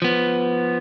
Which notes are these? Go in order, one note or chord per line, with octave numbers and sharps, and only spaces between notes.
F3 B3